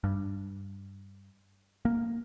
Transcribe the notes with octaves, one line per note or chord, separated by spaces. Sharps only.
G2
A#3